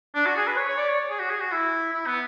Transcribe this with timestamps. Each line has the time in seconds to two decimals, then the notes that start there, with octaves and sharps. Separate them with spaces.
0.15 D4
0.26 F#4
0.37 G#4
0.47 B4
0.57 C#5
0.68 C#5
0.78 D5
0.89 C#5
1.10 G#4
1.20 F#4
1.30 G#4
1.40 F#4
1.52 E4
1.93 E4
2.07 B3